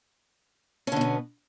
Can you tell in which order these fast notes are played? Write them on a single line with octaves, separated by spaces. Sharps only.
C#4 D3 B2 B3